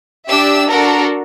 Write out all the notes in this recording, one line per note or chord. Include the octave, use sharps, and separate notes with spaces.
D4 G4 E5 E6
D4 F#4 A4 A#4 A#5